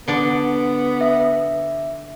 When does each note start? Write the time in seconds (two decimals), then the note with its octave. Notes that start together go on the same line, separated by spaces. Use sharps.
0.08 D3 B3 D4 D5
1.01 E5